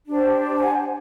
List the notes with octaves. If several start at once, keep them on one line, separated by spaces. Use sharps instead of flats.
D4 G4 C5
A5
F#5 G#5